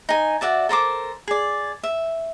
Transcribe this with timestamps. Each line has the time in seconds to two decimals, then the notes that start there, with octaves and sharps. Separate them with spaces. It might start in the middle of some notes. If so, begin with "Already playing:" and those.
0.09 D#4 G#5
0.41 F#4 D5 E5 A5
0.69 A4 A#4 C5 D6
1.28 G#4 D5
1.83 E5